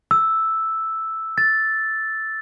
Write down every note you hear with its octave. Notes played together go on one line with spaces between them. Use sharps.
E6
A6